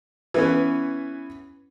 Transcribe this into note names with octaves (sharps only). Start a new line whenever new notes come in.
E3 B3 C#4